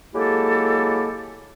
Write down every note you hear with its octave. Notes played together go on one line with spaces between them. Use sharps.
F#3 G#3 A#3 E4 G4 A4